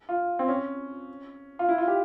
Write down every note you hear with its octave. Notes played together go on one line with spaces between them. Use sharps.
F4
C4
C#4
F4
E4
F4
G4